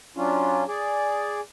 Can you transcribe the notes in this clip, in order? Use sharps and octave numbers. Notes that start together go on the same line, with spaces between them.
F#3 C#4 D4 F4
G#4 D5